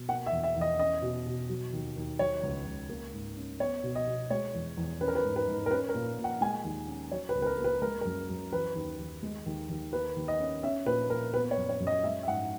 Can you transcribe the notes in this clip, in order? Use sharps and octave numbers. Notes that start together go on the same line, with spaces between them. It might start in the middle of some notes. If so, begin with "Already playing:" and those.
Already playing: B2
A#3 F#5
E5
E2
E5
E2
D#5
C#4 D#5
B2
B2
F#3
D#2
D#2
F#3 C#5
C#2
C#2
A#3
G#2
C#4
B3 C#5
B2
D#5
B2
G#3 C#5
E2
E2
C#4 B4
A#4
B4
G#2
B4
G#2
A#4
C#4 B4
A#4
A#2
A#2
F#5
G#3 G#5
D#2
C#4
F#3 C#5
B4
C#2
B4
A#4
A#3
B4
G#3 A#4
F#2 A#4
F#2
E3 B4
D#2
D#2
G#3
D#2
D#2
A#3 B4
D#2
D#5
C#4
C#4 E5
A#2 B4
A#2 A#4
B3 B4
C#5
F#2
C#5
F#2
D#5
G#3 E5
E5
G#2 F#5